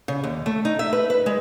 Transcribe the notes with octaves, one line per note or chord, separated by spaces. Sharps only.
C#3
D#2
A3
D#4
E5
B4
B4
G#3